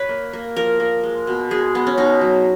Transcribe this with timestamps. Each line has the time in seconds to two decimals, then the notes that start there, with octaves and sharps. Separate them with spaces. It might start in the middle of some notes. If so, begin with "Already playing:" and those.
Already playing: B4 C#5
0.09 A#3
0.33 A#3
0.56 F3 A#4
0.80 A#3
1.03 G#3
1.27 B2
1.51 G#3 G#4
1.75 G#3 B3
1.87 C#4
1.98 B2 D#4
2.21 F#3